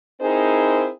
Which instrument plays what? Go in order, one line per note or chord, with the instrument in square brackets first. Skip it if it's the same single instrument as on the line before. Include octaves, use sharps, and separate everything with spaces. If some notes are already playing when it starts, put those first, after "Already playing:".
[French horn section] C4 D#4 E4 G#4 A#4 C5